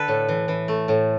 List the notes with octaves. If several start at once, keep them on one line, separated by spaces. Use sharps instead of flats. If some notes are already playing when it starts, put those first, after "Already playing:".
Already playing: D3 A4 B4
A2
E3
E3
A3
A2